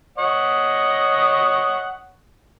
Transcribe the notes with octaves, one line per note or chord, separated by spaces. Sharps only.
C#5 D#5 F#5